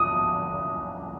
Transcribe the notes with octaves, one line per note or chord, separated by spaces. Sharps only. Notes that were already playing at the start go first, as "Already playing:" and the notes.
Already playing: D#6